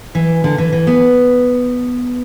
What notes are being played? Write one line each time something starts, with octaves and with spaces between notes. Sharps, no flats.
E3
D3
E3
E3
B3